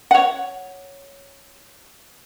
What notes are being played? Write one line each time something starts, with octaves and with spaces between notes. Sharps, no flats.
C#5 F#5